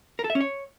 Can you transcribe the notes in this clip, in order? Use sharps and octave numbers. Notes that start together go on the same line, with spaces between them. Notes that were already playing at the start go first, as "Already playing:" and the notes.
A#4
A4
E5
C#4
C#5